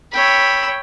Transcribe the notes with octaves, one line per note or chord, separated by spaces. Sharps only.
C#5 G5 B5 E6